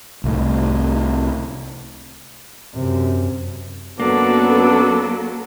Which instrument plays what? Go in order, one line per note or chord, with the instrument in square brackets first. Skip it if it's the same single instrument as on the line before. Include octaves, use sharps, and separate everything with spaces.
[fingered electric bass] C2 A2
[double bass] F#2 C3
[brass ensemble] F#2 B3 [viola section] F#3 A4 [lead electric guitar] A#3 [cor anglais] D4